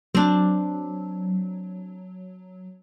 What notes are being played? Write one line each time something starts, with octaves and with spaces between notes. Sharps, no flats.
F#3 C4 D4